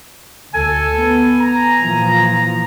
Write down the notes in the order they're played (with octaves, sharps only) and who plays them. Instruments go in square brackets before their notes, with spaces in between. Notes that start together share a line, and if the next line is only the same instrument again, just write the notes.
[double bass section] D2 [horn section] A4 [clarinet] G#5
[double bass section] B3
[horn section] A#5
[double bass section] A#2 E3 F3